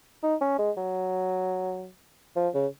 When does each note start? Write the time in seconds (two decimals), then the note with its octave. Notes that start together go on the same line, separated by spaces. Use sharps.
0.23 D#4
0.41 C#4
0.59 G#3
0.77 F#3
2.36 F3
2.54 C#3